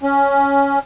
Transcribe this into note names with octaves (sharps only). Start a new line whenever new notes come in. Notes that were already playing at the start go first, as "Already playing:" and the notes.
C#4